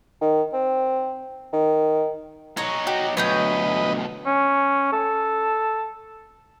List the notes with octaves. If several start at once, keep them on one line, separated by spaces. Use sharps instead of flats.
D#3
C4
D#3
F#3 D#4 F#4 C#5
F#4 G4 D#5
D2 B2 F#3 B4 C#5 D#5 D#6 G6
C#4
A4